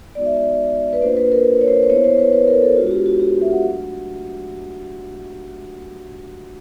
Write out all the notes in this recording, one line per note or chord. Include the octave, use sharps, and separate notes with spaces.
G#3 B3 D#4 F#4 D5
E5
D5
B4
A#3 D4 F4 C5
B4
A#4
C#5
C5
C5
B3 E4 C#5
C5
B4
B4
A#4
A4
G#3 B3 D4 F4 F#4
F#4
G4
F#4
G4
E5
F#5
F#3 A3 D4 F#4